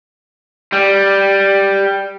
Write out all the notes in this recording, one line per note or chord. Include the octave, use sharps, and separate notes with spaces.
G3